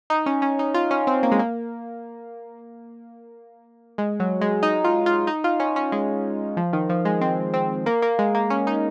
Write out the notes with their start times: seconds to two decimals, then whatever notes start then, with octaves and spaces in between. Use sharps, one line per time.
0.10 D#4
0.26 C#4
0.42 C#4
0.59 D#4
0.74 F4
0.91 C#4
1.07 C4
1.23 A#3
1.32 G#3
1.39 A#3
3.98 G#3
4.20 F#3
4.41 G#3
4.63 D#4
4.84 F4
5.06 F4
5.27 D#4
5.44 F4
5.60 C#4
5.76 C#4
5.92 G#3
6.57 F3
6.73 D#3
6.89 F3
7.05 G#3
7.21 C4
7.54 C4
7.86 A#3
8.02 A#3
8.19 G#3
8.35 A#3
8.50 C#4
8.67 D#4